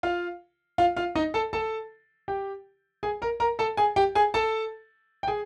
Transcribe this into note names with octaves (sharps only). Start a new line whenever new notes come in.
F4 F5
F4 F5
F4 F5
D#4 D#5
A4 A5
A4 A5
G4 G5
G#4 G#5
A#4 A#5
A#4 A#5
A4 A5
G#4 G#5
G4 G5
G#4 G#5
A4 A5
G5
G#4 G#5